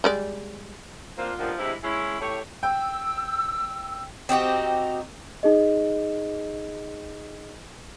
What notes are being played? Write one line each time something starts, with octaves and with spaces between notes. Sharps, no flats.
G3 G#3 D5
A#3 C4 D4 F4
G2 A#2 D#3 F3 B3
G2 C3 G#3 E4
G#3 C#4 E4
A2 G4 C#5
G5 E6
C4 D#4 F#4 G4
D#4 G#4 D#5